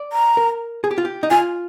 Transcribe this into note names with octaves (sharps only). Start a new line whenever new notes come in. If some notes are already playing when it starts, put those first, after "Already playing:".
Already playing: D5
A#5
A#4
G#4
G4
F4
G4
D#4
F4 G#5